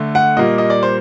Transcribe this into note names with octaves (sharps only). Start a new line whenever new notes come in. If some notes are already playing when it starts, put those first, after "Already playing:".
Already playing: D3 A3
F#5
A#2 G3 A#3 D#5
D#5
D5
C5